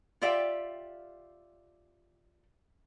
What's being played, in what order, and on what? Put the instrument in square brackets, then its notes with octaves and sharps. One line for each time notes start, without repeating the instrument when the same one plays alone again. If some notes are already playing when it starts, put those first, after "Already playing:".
[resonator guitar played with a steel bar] F4 G4 D5 E5 F5 G5